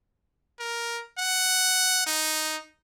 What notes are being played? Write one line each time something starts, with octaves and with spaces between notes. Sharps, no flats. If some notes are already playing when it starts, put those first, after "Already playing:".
A#4
F#5
D#4